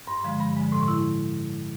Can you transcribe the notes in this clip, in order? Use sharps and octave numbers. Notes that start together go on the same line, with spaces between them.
G2 C6
D3 F3 G#3
G2 B5
D3 F3 G#3
A2 C6
C#6
E4